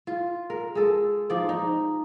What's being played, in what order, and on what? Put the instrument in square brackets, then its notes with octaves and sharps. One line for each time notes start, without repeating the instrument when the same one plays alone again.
[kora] F4
A#4
G#3 A4
F3 D#4 D5
D#4